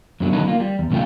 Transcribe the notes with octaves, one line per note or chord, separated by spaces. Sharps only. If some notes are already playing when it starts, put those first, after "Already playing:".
F#2 B2 D3 F#3
B1 D#3 F#3 C#4 D#4 B4
A#3 F4
G3
E2
B1 C#3 A3 F4 G5